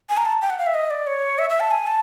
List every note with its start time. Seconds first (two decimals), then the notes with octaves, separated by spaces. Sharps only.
0.09 G#5
0.17 A#5
0.26 A5
0.42 G5
0.50 F#5
0.58 F5
0.66 E5
0.74 D#5
0.90 D5
1.07 C#5
1.39 E5
1.50 E5
1.60 A5
1.71 G#5
1.87 A5